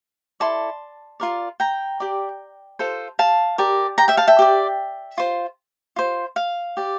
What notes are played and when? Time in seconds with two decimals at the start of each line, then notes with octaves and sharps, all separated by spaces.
0.40 E4 A4 D5 A5 C6
1.20 F4 A#4 D5
1.60 G5 A#5
2.00 G4 D5
2.79 F4 A4 C5
3.19 F5 A5
3.58 G4 A#4 D5
3.98 G5 A#5
4.08 E5 G5
4.17 F5 A5
4.28 E5 G5
4.39 G4 D5
5.18 F4 C5
5.96 F4 C5
6.36 F5
6.77 G4 D5